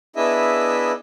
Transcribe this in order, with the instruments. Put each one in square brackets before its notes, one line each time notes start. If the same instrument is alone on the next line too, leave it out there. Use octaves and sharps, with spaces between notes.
[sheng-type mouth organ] B3 D4 E4 G#4 D#5 E5